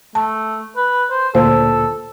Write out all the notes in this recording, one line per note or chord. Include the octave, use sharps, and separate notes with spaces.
A3 A5
B4
C5
D2 A#2 A4 C5 A5